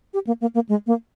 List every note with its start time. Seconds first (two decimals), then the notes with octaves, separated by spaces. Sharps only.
0.14 G4
0.27 A#3
0.41 A#3
0.54 A#3
0.69 G#3
0.87 A#3